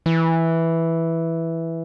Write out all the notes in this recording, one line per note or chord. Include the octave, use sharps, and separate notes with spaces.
E3